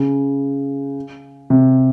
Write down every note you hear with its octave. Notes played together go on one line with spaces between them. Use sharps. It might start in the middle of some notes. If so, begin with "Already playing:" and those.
Already playing: C#3
C3